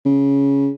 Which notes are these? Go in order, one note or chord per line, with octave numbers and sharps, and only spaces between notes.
C#3